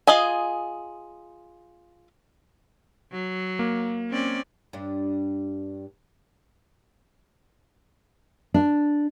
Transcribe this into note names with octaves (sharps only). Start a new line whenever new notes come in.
F4 G#4 D#5 G#5
F#3
A#3
C4 C#4 D5
G2 D4
D4